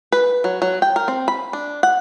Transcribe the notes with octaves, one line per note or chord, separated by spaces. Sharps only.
B4
F#3
F#3
G5
A#4
C4
B5
D4
F#5